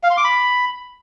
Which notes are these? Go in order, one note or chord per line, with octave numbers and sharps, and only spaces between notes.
F5
C6
D6
B5